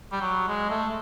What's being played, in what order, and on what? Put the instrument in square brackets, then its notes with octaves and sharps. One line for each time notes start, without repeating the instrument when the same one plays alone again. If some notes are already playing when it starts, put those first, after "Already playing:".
[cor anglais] G3
F#3
G#3
A3